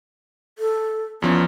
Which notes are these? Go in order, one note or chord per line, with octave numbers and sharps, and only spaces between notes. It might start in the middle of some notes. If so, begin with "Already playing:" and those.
A4
E2 F3 B3 C#4